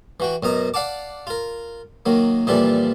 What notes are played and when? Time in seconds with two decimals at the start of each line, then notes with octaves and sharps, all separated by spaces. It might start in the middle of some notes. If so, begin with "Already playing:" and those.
0.20 E3 F#4 G5
0.43 F#2 B2 D#5 A#5
0.74 D5 F5 F#5 A5 D6
1.27 F4 A#4
2.06 D#3 F#3 A#3
2.47 A#2 E3 F3 G3 D4 A4